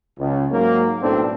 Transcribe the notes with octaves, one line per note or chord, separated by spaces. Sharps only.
C#2
G#2 F#3 A#3
B1 A2 C4 D4 A4